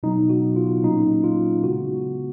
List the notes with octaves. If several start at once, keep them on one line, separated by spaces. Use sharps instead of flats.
B2 F#3 B3 D#4
F#4
F4
A#2 F#3 A#3 C#4 D#4
F4
C#3 G#3 B3 F#4